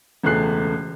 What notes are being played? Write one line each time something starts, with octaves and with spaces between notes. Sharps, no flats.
E1 C#2 A3 F#6 C7